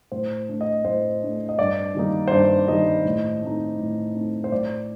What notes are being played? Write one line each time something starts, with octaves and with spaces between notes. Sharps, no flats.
A2 C5
A3 D4
D#5
A2 C5
A3 D4
D#5
G2 D5
D#3 G3 A#3 D#4
C5
G2 D5
D#3 G3 A#3 D#4 D#5
A2
A3 C4 D#4
A2
A3 C4 D#4
C5
A2 D5